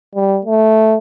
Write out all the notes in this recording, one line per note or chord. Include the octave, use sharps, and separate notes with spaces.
G3
A3